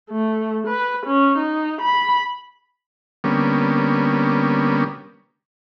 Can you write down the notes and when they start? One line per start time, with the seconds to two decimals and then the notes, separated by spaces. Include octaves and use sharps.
0.10 A3
0.67 B4
1.06 C#4
1.38 D#4
1.81 B5
3.24 D3 G3 A#3 B3 C#4